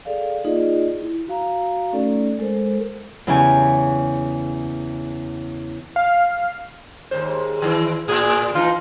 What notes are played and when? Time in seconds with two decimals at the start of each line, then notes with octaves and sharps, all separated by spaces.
0.05 G#4 A4 D5 F5
0.45 A#3 D#4 F4 G#4 D5 D#5
1.00 E4
1.28 F#4 F5 A#5
1.93 A3 C#4 D#4 A4 D5
2.39 G#3 A4 A#4 C5
3.27 E2 C#3 E3 C#4 G4 G#5
5.96 F5
7.11 D#2 G#2 C5
7.62 D#3 E3 E4
8.08 A2 G#4
8.55 E3 D#4 F4